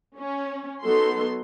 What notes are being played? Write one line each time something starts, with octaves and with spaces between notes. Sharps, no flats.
C#4
F#3 B3 D#4 A4 C6